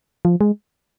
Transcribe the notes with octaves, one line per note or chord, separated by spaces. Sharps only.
F3
G#3